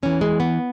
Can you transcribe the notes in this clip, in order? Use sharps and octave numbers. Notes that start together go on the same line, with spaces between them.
E2 E3 C#4
G#3
B3